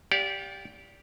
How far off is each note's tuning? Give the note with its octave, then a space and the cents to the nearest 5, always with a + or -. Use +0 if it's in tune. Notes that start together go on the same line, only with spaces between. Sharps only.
G4 +0 D5 -25 F5 +45